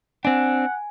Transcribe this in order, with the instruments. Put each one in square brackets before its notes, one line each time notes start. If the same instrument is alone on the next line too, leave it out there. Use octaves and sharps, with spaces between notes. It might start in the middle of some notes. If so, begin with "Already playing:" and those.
[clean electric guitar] C4 D4 [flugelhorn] F#5 [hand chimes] G#5